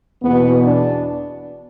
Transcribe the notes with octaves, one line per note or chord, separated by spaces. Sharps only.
E2 B2 B3
D4